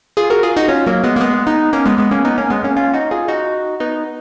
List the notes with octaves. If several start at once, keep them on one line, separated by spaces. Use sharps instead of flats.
F4 G#4
F#4 A#4
F4 G#4
D#4 F#4
C#4 F4
F#3 A#3
G#3 B3
A#3
G#3 B3
B3 D#4
A#3 C#4
G#3 B3
G#3 B3
A#3 C#4
B3 D#4
A#3 C#4
G#3 B3
A#3 C#4
C#4 F4
D#4 F#4
F4 G#4
D#4 F#4
B3 D#4